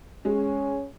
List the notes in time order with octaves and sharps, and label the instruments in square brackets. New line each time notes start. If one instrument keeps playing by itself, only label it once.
[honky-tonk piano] G#3 [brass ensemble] C#4